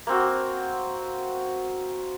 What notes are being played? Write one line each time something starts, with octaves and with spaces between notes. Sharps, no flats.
A#3 C4 F#4